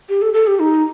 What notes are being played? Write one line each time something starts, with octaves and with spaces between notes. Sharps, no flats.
G4
A4
A4
G4
D#4